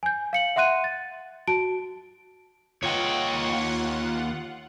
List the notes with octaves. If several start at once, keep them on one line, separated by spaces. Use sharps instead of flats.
G#5 G6
F5 C#7 F#7
E5 F#5 C6 F#6 D#7
A6
F#4 A5 D7
D#2 F4 C#5 D#5 F#5 G5